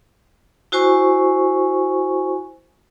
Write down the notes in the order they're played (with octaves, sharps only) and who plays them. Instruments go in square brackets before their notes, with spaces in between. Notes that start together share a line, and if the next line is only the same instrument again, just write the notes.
[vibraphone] E4 F#4 C5 G#5 C#6